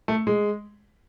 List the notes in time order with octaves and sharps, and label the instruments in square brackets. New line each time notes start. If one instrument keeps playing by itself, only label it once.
[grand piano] A3
G#3